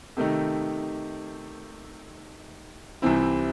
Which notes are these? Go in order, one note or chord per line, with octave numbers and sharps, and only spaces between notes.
C3 D#3 A3 D#4
C2 C3 E3 C4 E4